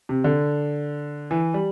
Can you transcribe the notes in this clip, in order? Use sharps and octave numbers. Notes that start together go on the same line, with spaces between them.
C3
D3
E3
G3